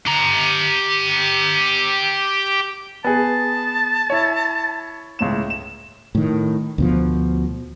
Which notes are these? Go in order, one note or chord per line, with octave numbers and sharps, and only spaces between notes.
G4 A#5
B3 G#4 A5
E4 C#5
C#2 A2 E7
E7
A2 D#3
D2 B2 F3